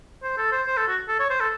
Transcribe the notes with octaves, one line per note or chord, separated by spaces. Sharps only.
C5
A4
C5
C5
A4
F#4
A4
C#5
C5
A4